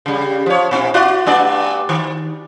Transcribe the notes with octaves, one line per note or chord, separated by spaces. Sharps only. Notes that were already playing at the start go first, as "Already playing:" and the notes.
C#3 G3
F3 C#5
A#2 C4 E4
E4 F#4 D5
G2 A3 D5
D#3